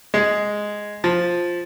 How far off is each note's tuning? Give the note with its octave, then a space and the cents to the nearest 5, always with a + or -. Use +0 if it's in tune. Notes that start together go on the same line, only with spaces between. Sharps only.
G#3 +0
F3 +5